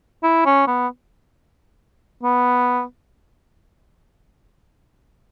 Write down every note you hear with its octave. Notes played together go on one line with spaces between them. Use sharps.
E4
C#4
B3
B3